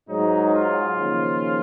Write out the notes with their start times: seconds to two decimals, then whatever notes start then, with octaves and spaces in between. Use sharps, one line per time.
0.08 G#2 F#3 D#4
0.53 F4
0.98 D#2 C#3 F3